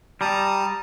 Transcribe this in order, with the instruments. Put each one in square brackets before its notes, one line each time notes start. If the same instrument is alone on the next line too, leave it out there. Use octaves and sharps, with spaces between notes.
[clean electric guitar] G3 [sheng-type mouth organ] A5 A#5 D#6